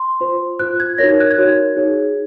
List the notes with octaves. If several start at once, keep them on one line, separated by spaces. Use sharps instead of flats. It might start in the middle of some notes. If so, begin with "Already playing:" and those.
Already playing: C6
F4 C5
F4 C5 F#6
G#6
D#4 F#4 A#4 C#5 A#6
G#6
F#6
G#6
D#4 F#4 A#4 C#5
D#4 G#4 C#5